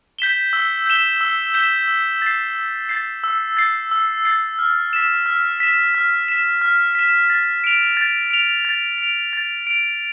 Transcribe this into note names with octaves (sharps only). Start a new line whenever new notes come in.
G6 B6 E7 G7
E6
G6 B6 E7 G7
E6
G6 B6 E7 G7
E6
A6 C7
E6
A6 C7
E6
A6 C7
E6
A6 C7
F6
B6 E7
F6
B6 E7
F6
B6 E7
F6
B6 E7
A6
D7 F7
A6
D7 F7
A6
D7
F7
A6
D7 F7